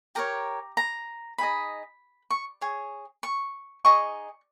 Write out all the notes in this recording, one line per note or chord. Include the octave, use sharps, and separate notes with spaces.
G4 A#4 C#5 A#5
A#5
D#4 G#4 D#5 B5
C#6
G#4 C#5
C#6
D#4 G#4 D#5 C#6